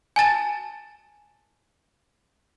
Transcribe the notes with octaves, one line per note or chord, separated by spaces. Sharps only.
G#5 A5 A6 E7